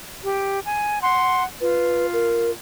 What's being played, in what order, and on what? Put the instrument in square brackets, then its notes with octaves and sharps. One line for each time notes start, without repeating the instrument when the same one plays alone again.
[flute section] G4
G#5
F#5 C6
[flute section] F4 [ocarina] B4
[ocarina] A#4